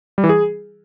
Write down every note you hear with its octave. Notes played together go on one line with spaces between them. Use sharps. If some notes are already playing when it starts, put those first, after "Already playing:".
G3
E3
G#4